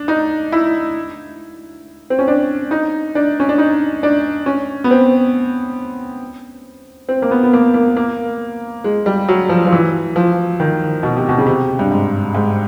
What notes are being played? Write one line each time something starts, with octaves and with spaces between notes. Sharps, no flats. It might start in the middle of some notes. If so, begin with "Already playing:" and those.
Already playing: D4
D#4
E4
C4
C#4
D4
D#4
D4
C#4
D4
D#4
D4
C#4
B3
C4
C4
A#3
B3
B3
A#3
A#3
A#3
G#3
G3
F#3
F3
F3
E3
F3
D#3
B2
C3
B2
C#3
C3
G2
G#2
G#2